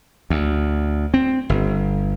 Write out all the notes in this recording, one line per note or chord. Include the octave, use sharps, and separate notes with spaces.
D2
C4
G1